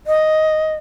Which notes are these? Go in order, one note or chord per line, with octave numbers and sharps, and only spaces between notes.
D#5